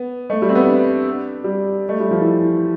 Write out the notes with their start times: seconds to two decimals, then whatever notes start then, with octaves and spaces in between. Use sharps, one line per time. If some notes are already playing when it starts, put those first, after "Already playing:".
Already playing: B3
0.30 A3
0.42 G3
0.49 C4
0.55 B3
0.67 D4
1.44 G3
1.89 A3
2.00 G3
2.11 F3
2.21 E3